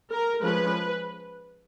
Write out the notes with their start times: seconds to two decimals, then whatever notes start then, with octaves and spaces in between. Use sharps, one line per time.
0.11 A#4
0.44 F3 G#3 C#4 B4